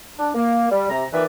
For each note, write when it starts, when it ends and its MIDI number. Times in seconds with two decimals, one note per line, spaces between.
0.18 0.28 62
0.34 0.67 58
0.71 0.88 55
0.90 1.05 48
0.90 1.05 82
1.12 1.24 46
1.12 1.24 51
1.12 1.24 52
1.12 1.24 71
1.12 1.24 74
1.12 1.24 76